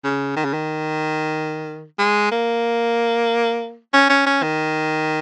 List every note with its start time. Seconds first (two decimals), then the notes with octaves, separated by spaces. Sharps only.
0.04 C#3
0.36 D#3
0.45 C#3
0.54 D#3
1.99 G#3
2.31 A#3
3.94 C#4
4.09 C#4
4.26 C#4
4.42 D#3